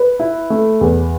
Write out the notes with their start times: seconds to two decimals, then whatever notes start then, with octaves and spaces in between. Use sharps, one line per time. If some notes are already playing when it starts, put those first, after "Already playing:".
Already playing: B4
0.20 E4
0.50 A3
0.81 E2